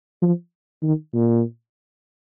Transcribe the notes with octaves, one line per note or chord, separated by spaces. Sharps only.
F3
D#3
A#2